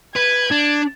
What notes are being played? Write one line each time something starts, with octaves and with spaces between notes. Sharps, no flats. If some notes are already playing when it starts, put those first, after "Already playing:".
B4 G#6
D4